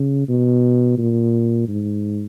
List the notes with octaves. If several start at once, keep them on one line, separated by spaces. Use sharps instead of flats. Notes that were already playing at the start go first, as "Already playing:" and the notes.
Already playing: C#3
B2
A#2
G#2